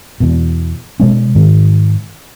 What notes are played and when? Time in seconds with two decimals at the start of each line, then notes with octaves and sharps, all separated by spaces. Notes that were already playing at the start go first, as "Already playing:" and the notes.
0.20 E2 B2
1.00 B2 G#3 C#4
1.35 G#2 D#3